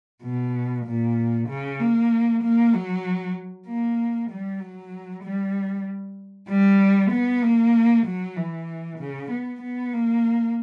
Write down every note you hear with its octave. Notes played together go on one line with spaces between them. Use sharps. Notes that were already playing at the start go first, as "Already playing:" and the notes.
B2
A#2
C#3
A#3
A#3
F#3
A#3
G3
F#3
G3
G3
B3
A#3
F#3
E3
C#3
B3
B3
A#3